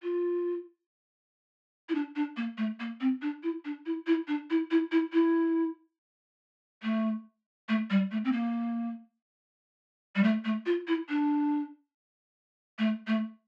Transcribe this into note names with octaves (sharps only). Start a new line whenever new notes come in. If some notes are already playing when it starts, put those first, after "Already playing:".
F4
E4
D4
D4
A#3
A3
A#3
C4
D4
E4
D4
E4
E4
D4
E4
E4
E4
E4
A3
A3
G3
A3
C4
A#3
G3
A3
A3
F4
E4
D4
A3
A3